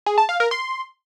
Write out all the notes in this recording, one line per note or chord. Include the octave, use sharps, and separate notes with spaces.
G#4
A5
F5
A#4
C6